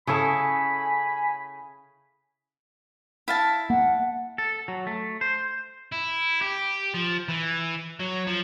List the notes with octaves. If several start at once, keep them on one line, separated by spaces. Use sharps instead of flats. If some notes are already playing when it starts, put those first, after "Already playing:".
C#3 C#4 E4 G#4 A4 G#5 B5
E4 F5 A5
A#3 F#5
A4
F#3
A3
C5
E4
G4
F3
E3
F#3
F3